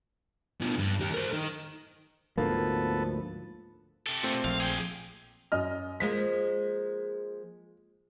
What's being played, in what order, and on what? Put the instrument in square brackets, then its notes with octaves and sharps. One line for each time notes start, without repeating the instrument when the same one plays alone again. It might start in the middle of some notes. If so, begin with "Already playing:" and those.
[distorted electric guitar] B2 F3
G2
D#2 G4
A#4 C5
D#3
[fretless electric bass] D2 G#2 A#3 [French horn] F3 [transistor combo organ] B3 A4
[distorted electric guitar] C3 A4
[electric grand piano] A#2 A3 C4
[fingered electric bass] A#1 F3 [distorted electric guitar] F5
[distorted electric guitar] G#4 G5
[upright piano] F#2 D#5 F6
[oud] F3 G#3 A#3 [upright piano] B6